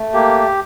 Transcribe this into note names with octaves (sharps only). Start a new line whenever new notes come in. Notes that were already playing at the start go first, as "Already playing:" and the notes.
Already playing: A3
A#3 G4